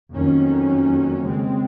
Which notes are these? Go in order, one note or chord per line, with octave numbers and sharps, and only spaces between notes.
F2 D#3 F#3 A#3 C#4
C#3 G#3 C4